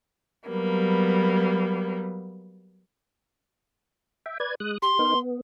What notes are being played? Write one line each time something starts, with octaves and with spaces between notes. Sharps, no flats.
F#3 G3 A#3 B3
E5 G5
B4 D5 G#6
G#3 D#6 F#6
G4 C6
B3 D#4 A#4
B3